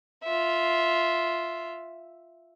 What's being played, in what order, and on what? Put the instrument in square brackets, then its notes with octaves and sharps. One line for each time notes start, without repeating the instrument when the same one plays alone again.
[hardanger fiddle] F4 E5